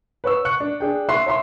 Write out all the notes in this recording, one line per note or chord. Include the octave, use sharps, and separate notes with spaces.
B4 C#5 C#6 E6
C#6 F#6 C#7
D4
D4 G#4 G5
E5 C6 C#6 F#6 C7
C#5 E5 C6